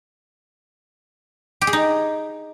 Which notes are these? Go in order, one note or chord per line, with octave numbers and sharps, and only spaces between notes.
G4
G#4
D#4